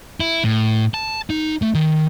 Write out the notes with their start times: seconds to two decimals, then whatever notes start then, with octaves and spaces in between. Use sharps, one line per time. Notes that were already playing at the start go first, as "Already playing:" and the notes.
0.20 E4
0.44 A2
0.94 A5
1.30 D#4
1.62 A3
1.75 D#3